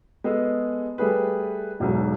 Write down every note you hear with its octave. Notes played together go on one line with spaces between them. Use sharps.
G#3 B3 G#4 A4
G3 A3 G#4 B4
E1 B1 G#2